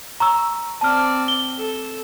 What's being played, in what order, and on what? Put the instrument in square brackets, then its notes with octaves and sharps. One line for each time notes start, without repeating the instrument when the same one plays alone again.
[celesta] A#5 C#6 E6
[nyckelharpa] C4 D5 [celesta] A5 F6
[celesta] G7
[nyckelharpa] A4